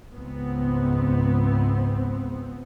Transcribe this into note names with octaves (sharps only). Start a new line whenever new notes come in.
C#2 G#2 B3 C4